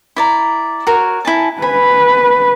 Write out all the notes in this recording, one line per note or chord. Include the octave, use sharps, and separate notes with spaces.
E4 D5 A#5
F#4 A#4 C#5
E4 G#5 A5
B4 G#5 B5